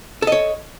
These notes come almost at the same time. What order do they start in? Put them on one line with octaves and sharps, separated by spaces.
A4 D#5 C#5